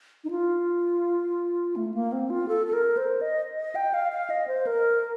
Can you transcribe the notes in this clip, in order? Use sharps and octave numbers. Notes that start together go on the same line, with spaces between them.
D#4
F4
A3
A#3
C4
F4
A4
A4
A#4
C5
D#5
D#5
G5
F5
F5
D#5
C5
A#4